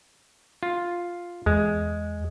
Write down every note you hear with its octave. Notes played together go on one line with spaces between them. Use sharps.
F4
E2 G#3